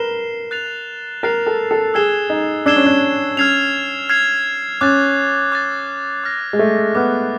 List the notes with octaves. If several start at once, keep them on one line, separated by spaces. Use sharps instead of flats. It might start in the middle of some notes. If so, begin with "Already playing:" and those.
Already playing: A#4 B4 C7 E7 G7
F#6 A6 C7 F7
A#4 F#6 A6 C7 F7
A4
A4
G#4 E6 G#6 C7 E7 G7
D#4
D4 E6 G#6 C7 E7 G7
C#4
D4
C#4 F6 G#6 C7 F7
F6 G#6 C7 F7
C#4 D6 F#6 A6
D6 F#6 A6
D6 F6 A#6
G#3
A3
B3 D6 F6 A#6